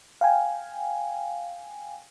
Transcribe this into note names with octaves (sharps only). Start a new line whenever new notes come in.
F5 G5 G#5